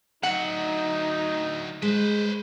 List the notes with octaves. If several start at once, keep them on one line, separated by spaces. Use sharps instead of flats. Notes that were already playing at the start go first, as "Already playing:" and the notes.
D2 F#3 D#4 F#5
G#3 B4 C5